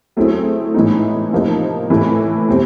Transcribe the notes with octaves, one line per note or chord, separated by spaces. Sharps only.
F#3 A3 C4 E4 G#4
A2 E3 G#3 B3 D#4
C3 F3 A#3 D#4
A2 E3 A3
B2 G3 C4